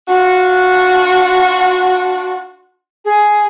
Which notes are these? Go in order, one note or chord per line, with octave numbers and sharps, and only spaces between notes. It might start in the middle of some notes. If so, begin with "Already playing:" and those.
D4 F4 F#4
G#4